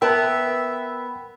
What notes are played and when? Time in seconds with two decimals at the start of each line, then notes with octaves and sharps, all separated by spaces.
0.02 B3 A#4 B4 E5 G5 A5